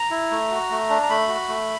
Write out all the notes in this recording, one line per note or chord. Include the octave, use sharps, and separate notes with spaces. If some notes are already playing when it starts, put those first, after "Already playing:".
Already playing: A#5
E4
A3
F#4
A3
D4
A#5
A3 B5
F#4
A3